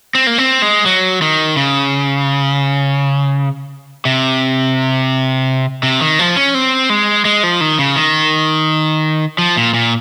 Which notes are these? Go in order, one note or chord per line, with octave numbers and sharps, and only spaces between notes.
C4
A#3
C4
G#3
F#3
D#3
C#3
C3
C3
D#3
F3
C#4
C4
G#3
G#3
F3
D#3
C#3
D#3
F3
A#2
A#2